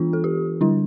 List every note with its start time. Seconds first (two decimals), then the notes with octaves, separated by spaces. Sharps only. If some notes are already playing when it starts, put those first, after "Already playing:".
Already playing: E3 B3 D4 F4
0.13 A4
0.24 G4
0.61 D3 G3 D4 E4